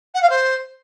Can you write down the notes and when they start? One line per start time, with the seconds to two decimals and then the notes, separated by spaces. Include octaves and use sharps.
0.14 F#5
0.22 F5
0.29 C5